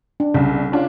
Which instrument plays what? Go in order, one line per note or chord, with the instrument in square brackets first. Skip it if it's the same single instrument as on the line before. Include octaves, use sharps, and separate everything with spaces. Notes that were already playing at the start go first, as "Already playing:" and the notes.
[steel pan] D4
[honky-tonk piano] C2 [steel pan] C#3
[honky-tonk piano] C#4 D4 F4